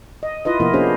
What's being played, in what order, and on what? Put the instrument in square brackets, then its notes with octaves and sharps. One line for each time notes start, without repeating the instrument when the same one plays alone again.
[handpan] D#5
E4 F4 B4 D#5
C3 F3 A#3 B3 E4 A#4
A#3 C#4 D4 F#4 G#4 C5